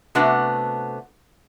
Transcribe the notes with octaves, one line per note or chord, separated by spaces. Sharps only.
C3 A3 B3 D4 F#4